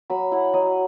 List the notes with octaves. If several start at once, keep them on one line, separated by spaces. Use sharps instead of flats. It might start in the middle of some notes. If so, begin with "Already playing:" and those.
F#3 B5
E4 F#5
F#3 D#5